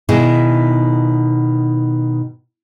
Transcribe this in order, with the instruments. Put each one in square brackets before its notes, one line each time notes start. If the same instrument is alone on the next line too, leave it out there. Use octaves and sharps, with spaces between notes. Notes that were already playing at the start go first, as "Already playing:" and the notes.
[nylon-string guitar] B2 D#3 E4 G#4